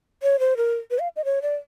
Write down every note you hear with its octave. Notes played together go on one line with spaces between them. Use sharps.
C#5
C5
A#4
B4
F5
D#5
C#5
D5